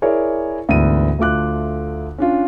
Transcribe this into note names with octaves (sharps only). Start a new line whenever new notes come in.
E4 G#4 A#4 C#5 D5
D2 G#2 E3 B3 D#7
D2 A3 F4 D6 F#6
C#4 D4 F4